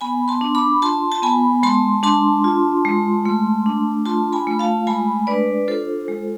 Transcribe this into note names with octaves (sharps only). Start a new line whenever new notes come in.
B3 G#5 B5
A5 C6
D4
B5 D6
F4 A5 C6
A5
B3 G#5 B5
G#3 A5 C6
D4 A5 C6
F4
G#3
A3
D4
F4 A5 C6
G#5 B5
A3
F5 A5
G#3 G#5 B5
D4 B4 D5
F4 A4 C5
G#3